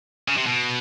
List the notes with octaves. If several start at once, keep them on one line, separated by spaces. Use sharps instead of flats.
C#3
C3
B2